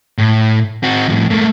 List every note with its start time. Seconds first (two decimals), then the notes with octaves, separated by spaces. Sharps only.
0.18 A2
0.83 C4 F#4
1.08 F2 A2
1.30 A3 A#3